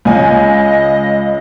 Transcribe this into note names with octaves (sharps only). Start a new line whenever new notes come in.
C#2 D#5 G#5